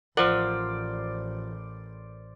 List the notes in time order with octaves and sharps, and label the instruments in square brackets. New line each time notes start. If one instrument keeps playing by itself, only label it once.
[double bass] A1 [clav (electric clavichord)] F3 F#5 [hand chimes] A#4 F6 [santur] C5 D5